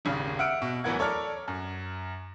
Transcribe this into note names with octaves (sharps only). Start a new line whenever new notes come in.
D#1 G#1 C#3
E5 F#5 E6 F6 D7
B2
D1 E3 B3 A#4 F#5 G#6
A4 C#5 D5 A#5 F6
F#2